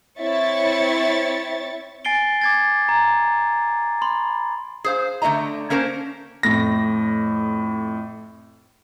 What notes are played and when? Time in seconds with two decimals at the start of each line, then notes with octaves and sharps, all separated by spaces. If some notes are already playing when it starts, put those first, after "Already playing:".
0.20 C4 E4 C#5 E5 C#6 A6
2.05 G#5 A6 C7 D7 G7
2.41 D6 G#6 A6
2.89 A#5
4.02 B5 C6
4.84 G#4 C5 F5
5.22 D3 A3 F#4 D#5 A#5
5.70 A#3 C#4 A#4 C5 A5
6.43 F2 A2 A#6